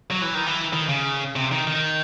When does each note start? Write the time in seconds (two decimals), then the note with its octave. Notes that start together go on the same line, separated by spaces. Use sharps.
0.11 F#3
0.22 E3
0.34 D#3
0.47 E3
0.73 D#3
0.89 C#3
1.36 C3
1.51 D#3
1.67 D#3